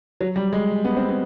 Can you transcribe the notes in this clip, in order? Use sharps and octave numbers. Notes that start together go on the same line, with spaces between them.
F#3
G3
G#3
B3
C4
B3